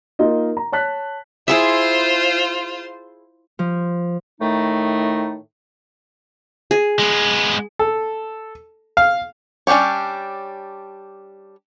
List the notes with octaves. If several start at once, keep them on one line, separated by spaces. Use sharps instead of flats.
A#3 D#4 F4 D#5
A#5
C#5 A5 F#6 B6
E4 F4 G#4 C5 E5
F3
A2 D#3 A3 D#4
G#4
G#3 B3
A4
F5
G3 C#4 D4 G4 C#5